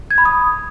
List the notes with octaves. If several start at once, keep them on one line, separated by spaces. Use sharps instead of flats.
G#6
B5
D#6